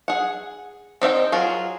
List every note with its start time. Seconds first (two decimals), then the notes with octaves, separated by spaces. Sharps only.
0.08 G#4 F#5
1.02 C4 D#4 E5 G5
1.32 F#3 F4 G#4 A#4